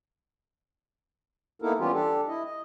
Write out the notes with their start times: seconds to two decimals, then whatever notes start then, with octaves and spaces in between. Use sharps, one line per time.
1.62 A#3 B3 D#4 E4 A4 A#4
1.79 E3 G3 B3 C#4 F4 G4
1.93 D4 G4 A4
2.28 E4 D#5
2.45 D#5